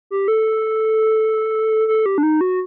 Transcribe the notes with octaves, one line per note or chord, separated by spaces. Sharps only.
G4
A4
A4
G4
D4
D#4
F#4